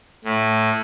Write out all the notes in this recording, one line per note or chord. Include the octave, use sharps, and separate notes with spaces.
A2